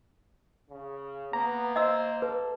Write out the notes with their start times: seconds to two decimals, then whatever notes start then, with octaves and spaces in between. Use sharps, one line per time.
0.70 C#3
1.33 A#3 B3 A#5
1.76 C5 D#5 E6
2.22 A4 B4